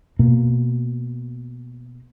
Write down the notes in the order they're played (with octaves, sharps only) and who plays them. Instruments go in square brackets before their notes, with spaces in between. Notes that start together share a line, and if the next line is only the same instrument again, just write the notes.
[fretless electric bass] B2 A#3